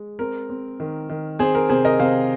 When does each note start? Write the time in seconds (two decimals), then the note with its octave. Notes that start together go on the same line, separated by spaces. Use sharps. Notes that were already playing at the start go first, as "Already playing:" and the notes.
Already playing: G#3
0.19 C4 A#4
0.50 C4
0.80 D#3
1.10 D#3
1.39 C4 G#4 C5
1.55 A#4
1.69 C3 G#4 C5
1.85 A#4 D#5
2.00 C3 C5 F5